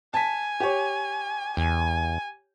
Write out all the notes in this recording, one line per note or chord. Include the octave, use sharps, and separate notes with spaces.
G#5 A5 B6
G4 C#5
E2 G#5